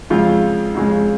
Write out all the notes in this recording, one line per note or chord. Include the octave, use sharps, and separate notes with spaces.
F2 C#3 G#3 F4
F2 C#3 G#3